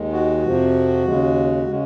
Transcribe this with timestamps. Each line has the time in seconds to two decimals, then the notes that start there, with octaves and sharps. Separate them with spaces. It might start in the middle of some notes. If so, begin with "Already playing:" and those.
Already playing: D#2 D#3 G#3
0.12 F#4
0.43 F2 C3 F3
1.04 D#2 C#3 G#3
1.67 C#3 G#3